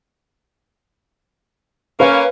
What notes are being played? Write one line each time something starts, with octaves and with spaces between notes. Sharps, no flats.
A#3 C#4 B4 F5